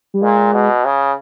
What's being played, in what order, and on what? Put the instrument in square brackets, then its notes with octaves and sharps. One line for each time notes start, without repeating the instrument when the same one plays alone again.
[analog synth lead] G3
[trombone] A#2 [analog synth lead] G#3
[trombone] B2
C#3